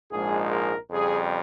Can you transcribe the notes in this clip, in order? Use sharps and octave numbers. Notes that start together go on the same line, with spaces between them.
A#1 G#2 F3 G#3 G#4
A#4
F2 C#3 G3 G#4